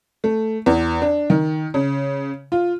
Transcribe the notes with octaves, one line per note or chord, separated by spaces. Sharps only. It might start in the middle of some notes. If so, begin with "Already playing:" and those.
A3
E2
D4
D#3
C#3
F4